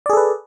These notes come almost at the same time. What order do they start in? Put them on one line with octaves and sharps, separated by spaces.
D5 G#4 A4 B4